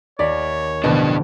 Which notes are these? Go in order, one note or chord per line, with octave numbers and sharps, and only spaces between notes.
D#2 A#4 C#5 D5 B6
A1 B2 D3 F3 D4 B4